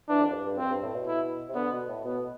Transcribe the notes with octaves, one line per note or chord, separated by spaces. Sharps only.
E3 D4
F2
G2
G2
F2 C4
G2
A2
B2
E4
C3
D3 B3
B2
A2
B2 B3